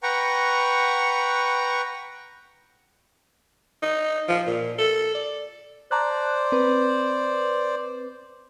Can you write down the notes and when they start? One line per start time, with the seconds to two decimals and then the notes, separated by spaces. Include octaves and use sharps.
0.03 B4 F#5 G5 A#5 C#6
3.82 D#4
4.28 F3
4.47 A#2
4.78 A4
5.14 D5
5.91 C5 D5 A5 A#5 F#6
6.52 C4 B4